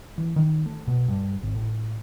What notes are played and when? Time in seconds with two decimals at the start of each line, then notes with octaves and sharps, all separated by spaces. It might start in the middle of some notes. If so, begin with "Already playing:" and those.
0.18 E3
0.36 D#3
0.66 A3
0.87 B2
1.08 G2
1.43 G#1
1.55 A2